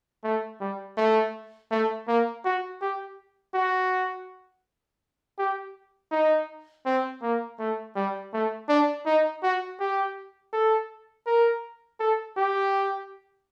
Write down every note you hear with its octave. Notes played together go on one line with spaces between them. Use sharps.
A3
G3
A3
A3
A#3
F#4
G4
F#4
G4
D#4
C4
A#3
A3
G3
A3
D4
D#4
F#4
G4
A4
A#4
A4
G4